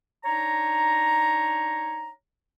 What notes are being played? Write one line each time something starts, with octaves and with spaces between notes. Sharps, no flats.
D4 D#4 C#5 A#5